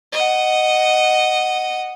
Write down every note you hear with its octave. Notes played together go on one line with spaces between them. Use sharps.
D#5 F#5